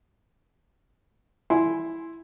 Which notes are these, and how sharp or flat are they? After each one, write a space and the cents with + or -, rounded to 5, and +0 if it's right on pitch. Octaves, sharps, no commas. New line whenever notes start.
E4 +0 G#5 +0 C6 +0